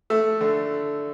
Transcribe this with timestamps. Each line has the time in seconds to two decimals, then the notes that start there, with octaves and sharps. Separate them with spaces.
0.10 A3 E6
0.41 D3